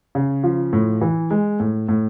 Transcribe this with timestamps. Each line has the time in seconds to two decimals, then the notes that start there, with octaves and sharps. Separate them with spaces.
0.15 C#3
0.44 F3
0.73 A2
1.01 E3
1.31 G#3
1.60 A2
1.89 A2